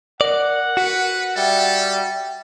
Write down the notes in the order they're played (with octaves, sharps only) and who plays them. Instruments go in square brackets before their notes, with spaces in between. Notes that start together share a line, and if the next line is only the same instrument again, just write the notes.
[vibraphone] A#4 [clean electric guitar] D5 [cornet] F#5
[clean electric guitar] F#4 [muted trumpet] B4
[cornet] G3 [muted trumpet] A4 [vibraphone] E5 G5